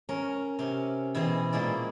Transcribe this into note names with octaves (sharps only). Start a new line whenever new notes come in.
C#4 A#4
C3 C#4
B2 E3 C4 G#4
A#2 G#3 A#3 E4 D5